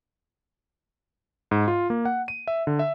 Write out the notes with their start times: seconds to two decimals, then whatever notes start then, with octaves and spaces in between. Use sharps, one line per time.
1.51 G#2
1.68 F4
1.90 A#3
2.05 F#5
2.28 D#7
2.47 E5
2.67 D3
2.79 E5